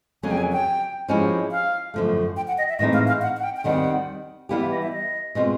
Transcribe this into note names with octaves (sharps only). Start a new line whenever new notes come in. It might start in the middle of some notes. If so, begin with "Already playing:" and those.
F2 C#3 F#3 A#3 C#4 G#5
G5
G#5
G5
F3 G#3 C#4 E4 G4
F5
F#2 D3 F3 A3
G5
F#5
D#5
E5
A2 E3 G#3 C4 D#4 D#5
F5
F5
F#5
F#5
G5
G5
D#2 D#3 G3 C4 F#5
E3 G3 B3 E4 G4 F5
E5
D#5
E5
D#5
B2 G#3 C4 F4